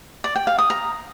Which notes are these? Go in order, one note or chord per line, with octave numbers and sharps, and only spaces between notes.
D5
G5
F5
D#6
A#5